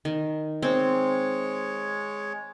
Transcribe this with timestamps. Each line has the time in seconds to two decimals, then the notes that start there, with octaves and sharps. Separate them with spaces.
0.05 D#3
0.63 G#3 C4 C#5